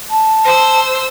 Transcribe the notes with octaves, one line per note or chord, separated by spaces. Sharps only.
A5
C5 E6